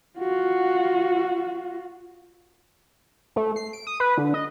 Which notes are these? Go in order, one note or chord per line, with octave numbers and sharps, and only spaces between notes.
F4 F#4
A3
C7
D7
D#6
B4
D3
D#5